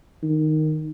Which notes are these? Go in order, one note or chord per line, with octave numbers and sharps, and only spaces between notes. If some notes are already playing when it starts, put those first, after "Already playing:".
D#3